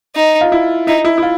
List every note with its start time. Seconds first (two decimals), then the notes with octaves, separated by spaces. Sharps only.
0.16 D#4
0.41 F4
0.52 E4
0.87 D#4 E4
1.05 E4
1.18 E4
1.23 F4